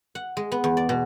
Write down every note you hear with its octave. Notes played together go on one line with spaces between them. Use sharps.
F#5
G#3
B3
E2
D5
B2